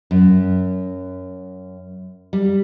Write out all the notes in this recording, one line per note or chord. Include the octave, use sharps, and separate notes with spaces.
F#2
G3